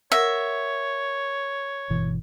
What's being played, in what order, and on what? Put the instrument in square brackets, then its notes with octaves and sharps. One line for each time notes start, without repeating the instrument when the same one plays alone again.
[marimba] A#4 F#5 [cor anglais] C#5 [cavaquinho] E5
[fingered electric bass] G1 B2 E3